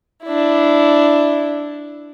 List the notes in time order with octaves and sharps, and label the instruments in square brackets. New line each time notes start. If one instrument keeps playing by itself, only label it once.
[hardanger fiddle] D4 E4